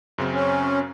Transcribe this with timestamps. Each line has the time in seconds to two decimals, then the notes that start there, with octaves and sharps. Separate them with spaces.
0.18 F#2 C#3 C4
0.33 C#4